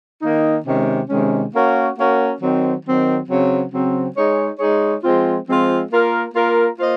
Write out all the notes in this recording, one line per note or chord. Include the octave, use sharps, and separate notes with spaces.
D#3 A#3 D#4
C3 D#3 G#3 C#4
C3 D#3 G#3 C#4
A#3 C#4 F#4 A#4
A#3 C#4 F#4 A#4
D#3 F#3 C4
D#3 F#3 C4
C#3 F#3 C4
C#3 F#3 C4
G#3 D#4 G#4 C#5
G#3 D#4 G#4 C#5
F3 G#3 C4 F4
F3 G#3 C4 F4
A#3 F4 A#4
A#3 F4 A#4
A#3 F4 C5 D#5